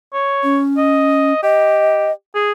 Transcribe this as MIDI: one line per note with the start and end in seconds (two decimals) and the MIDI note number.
0.14 0.60 73
0.44 1.33 61
0.77 1.42 75
1.43 2.10 67
1.43 2.12 75
2.35 2.52 68